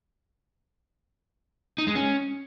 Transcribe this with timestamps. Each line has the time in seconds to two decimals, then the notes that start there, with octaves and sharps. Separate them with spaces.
1.78 D#4
1.87 G#3
1.95 C#4